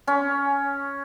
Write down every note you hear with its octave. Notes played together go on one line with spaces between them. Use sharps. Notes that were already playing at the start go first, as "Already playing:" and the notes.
C#4